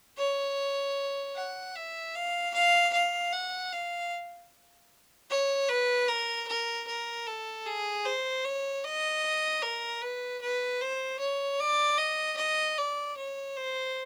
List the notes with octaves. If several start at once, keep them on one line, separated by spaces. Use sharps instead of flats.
C#5
F#5
E5
F5
F5
F5
F#5
F5
C#5
B4
A#4
A#4
A#4
A4
G#4
C5
C#5
D#5
A#4
B4
B4
C5
C#5
D5
D#5
D#5
D5
C#5
C5